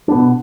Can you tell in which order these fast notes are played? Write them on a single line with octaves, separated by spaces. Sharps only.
D4 B3 B2